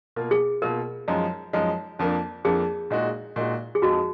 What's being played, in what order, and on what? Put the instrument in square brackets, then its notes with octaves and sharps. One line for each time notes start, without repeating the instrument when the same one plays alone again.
[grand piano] B2 A#3 F4
[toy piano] G#4
[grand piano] B2 A#3 F4 [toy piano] A#4
[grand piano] F#2 F3 G#3 D#4
F#2 F3 G#3 D#4
F2 F3 A#3 D4
[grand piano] F2 F3 A#3 D4 [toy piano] G#4
[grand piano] A#2 G#3 D#4 F#4
A#2 G#3 D#4 F#4
[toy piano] G#4
[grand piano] F2 F3 G#3 D#4 [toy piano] F#4